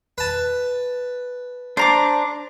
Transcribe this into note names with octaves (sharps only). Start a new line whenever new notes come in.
B4 A5
D4 C5 A#5 D6